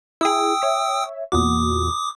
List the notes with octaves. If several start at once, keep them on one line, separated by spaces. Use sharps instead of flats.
E4 G#4 G5 D#6 E6
C#5 E5
E2 A#2 F#4 D6 D#6